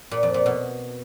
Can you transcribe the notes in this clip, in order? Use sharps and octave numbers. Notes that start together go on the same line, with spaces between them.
A#2
F2
A#2
B2